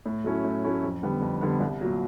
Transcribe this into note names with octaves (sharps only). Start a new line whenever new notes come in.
A2
F#3 A3 C#4 E4
A2
F#3 A3 C#4 E4
F2
D3 G3 B3
F2
D3 G3 B3
C2
A#2 F#3